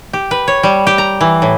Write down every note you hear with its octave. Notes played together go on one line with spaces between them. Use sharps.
G4
B4
C#5
G3
G4
A#5
E3
A2